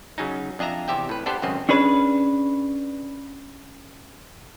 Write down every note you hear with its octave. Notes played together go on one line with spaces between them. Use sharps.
C#3 F#3 C#4 D#4
F2 D4 D#5 E5 A#5
E2 C3 G4 E5 G5
A2 B4
B3 D4 G4 A4 C5
G#1 F#2 C#3 C4 D#5
C#4 D4 G#4 B4